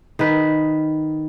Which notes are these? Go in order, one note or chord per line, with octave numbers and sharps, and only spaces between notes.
D#3 B4